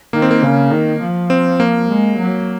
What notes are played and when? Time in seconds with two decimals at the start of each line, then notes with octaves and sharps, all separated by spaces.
0.13 D#3 A#3
0.22 C4
0.31 A#3
0.42 C#3
0.71 D#3
1.01 F3
1.30 C4
1.60 A#3
1.89 G#3
2.18 F#3